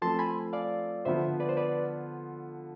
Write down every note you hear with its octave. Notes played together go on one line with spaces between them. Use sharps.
F3 A3 C4 A5 C6
G#5 B5
D5 F5
D3 F3 B3 F4 C5 E5
B4 D5
C5
B4 D5